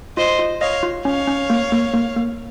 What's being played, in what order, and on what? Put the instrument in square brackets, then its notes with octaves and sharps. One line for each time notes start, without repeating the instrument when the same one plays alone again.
[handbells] F4 [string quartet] C5 D#5
[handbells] F4
[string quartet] C#5 F5 [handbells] D#5
[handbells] F4
[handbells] C#4 [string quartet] C#5 F5
[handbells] C#4
A#3
A#3
A#3
A#3